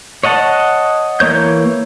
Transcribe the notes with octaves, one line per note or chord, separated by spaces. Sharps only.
C#5 D#5 F#5 A5
E3 A#3 C#5 G6